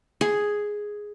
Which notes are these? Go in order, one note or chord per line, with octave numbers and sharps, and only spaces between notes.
G#4